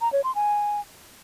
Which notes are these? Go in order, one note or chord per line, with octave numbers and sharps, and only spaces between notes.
A#5
C#5
C6
G#5